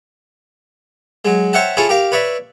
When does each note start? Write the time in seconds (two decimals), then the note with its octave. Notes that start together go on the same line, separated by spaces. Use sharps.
1.25 F#3 G#3
1.53 C5 C#5 E5 F#5 G5 A5
1.77 E4 F4 G#4 A4 C#5
1.89 G4 A#4 F5
2.12 B4 C#5 D5 E5